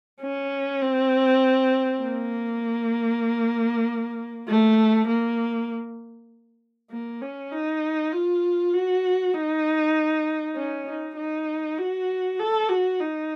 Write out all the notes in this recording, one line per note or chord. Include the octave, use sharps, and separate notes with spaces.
C#4
C4
A#3
A3
A#3
A#3
C#4
D#4
F4
F#4
D#4
C#4
D#4
D#4
F#4
A4
F#4
D#4